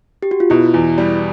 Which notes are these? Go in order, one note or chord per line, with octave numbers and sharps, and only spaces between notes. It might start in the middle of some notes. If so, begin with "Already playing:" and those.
G4
F#4
F4
B2 E4
E2
G3